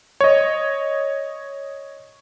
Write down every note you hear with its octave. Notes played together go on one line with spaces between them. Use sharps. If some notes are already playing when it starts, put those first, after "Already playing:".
C#5 D#5